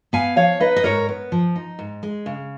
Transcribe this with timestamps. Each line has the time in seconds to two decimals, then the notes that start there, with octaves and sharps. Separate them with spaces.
0.13 B3 F5 G#5
0.36 F3 C#5 F5
0.60 D#4 B4 D#5
0.76 D#5
0.84 G#2 A#4 C#5
1.09 B3
1.32 F3
1.56 D#4
1.79 G#2
2.03 G#3
2.26 C#3